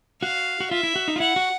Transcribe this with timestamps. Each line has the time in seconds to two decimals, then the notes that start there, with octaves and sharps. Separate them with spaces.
0.22 F#4 F5
0.60 F#4
0.71 F4 E5
0.83 E4
0.96 F#4
1.08 D#4
1.16 F4
1.20 E4 F#5
1.36 F#4